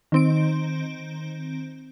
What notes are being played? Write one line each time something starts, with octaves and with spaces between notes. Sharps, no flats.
D#3 C4 D7